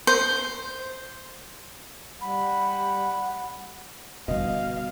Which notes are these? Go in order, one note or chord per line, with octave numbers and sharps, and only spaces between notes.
C5
G3 F#5 B5
B2 D3 G3 D#5 F5